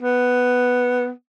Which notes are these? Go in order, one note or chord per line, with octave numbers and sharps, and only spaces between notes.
B3